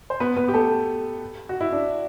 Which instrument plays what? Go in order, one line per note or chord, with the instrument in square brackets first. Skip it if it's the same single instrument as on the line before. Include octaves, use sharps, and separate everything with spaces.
[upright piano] C5
B3 B4
B3 B4
G4
A3 A4
F#4
E4
D4